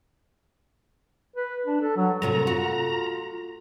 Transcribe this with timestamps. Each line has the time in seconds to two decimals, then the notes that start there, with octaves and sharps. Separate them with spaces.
1.36 B4
1.66 D4
1.81 A4
1.96 F#3
2.22 F#2 C3 A3 F4 A#5
2.47 F#4